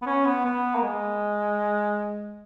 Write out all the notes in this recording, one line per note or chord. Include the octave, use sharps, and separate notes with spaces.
B3
C#4
B3
B3
A#3
G#3